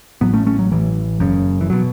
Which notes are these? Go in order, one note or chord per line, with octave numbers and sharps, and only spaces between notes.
A1 A2 F#3 B3
A3 C#4
A3 C#4
F#3
A1 A2 E3
F#1 F#2 C#3
E3
B2 F#3